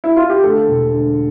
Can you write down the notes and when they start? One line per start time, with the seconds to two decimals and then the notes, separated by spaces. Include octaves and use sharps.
0.04 E4
0.16 F4
0.30 G4
0.43 D2 A4
0.68 E1
0.92 D3